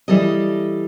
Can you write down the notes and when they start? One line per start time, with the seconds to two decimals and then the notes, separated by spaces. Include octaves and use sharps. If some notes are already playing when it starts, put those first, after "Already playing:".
0.08 E3 G3 A4 D#5